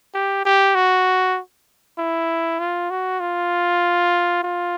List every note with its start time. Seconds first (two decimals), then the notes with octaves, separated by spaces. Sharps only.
0.14 G4
0.45 G4
0.75 F#4
1.98 E4
2.60 F4
2.90 F#4
3.20 F4
4.43 F4